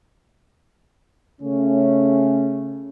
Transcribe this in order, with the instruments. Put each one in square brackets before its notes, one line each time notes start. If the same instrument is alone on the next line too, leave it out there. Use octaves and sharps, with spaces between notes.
[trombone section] C#3 A3 C#4